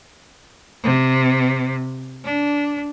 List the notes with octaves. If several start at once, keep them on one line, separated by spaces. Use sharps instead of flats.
C3
D4